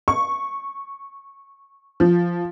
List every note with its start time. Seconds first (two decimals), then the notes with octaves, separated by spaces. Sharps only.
0.08 C#6
2.00 F3